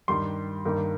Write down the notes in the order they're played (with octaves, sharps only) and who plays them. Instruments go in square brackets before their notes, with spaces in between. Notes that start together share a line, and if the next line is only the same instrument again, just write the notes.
[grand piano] G2 D#3 G3 C6
G2 D#3 A#3